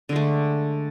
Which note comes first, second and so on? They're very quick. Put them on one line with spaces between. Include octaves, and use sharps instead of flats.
D3 G#3 A3